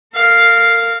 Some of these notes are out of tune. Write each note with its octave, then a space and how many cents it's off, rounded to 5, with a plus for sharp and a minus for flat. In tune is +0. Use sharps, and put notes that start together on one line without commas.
A#4 -35 F5 +0